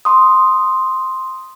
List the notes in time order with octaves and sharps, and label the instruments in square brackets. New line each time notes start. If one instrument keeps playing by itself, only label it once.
[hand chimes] C6 D#6